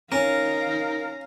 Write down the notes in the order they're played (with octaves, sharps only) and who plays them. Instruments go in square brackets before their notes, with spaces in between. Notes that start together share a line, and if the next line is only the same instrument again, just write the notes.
[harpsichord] C#4 [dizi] D#4 [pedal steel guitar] A#4 [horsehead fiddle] F5 A#5